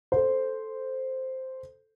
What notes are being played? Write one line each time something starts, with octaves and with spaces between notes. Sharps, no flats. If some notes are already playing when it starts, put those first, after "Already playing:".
A4 C5